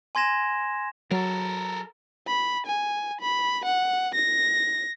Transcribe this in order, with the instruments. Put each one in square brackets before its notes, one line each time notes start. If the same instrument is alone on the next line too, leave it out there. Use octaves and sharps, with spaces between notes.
[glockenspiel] G#5 C6 G#6 A#6 E7
[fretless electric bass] F#3 [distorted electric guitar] A4 A#4
[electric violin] B5
G#5
B5
F#5
A#6